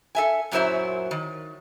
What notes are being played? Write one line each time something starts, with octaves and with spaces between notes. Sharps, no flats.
A4 E5 G#5
F#2 A#2 F#3 E4 C5 E5
D#3